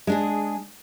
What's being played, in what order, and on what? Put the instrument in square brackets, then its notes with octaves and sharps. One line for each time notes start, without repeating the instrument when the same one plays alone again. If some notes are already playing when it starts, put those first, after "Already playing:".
[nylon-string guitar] G#3 D4 G#4